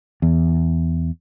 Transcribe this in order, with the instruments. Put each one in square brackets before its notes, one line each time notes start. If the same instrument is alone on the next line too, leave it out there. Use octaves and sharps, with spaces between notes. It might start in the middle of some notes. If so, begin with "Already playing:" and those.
[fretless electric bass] E2